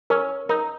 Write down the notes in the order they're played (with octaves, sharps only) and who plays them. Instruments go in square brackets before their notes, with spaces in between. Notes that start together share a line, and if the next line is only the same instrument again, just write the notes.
[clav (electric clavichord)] C#4 [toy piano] A#4
[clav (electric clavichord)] D#4 [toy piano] A#4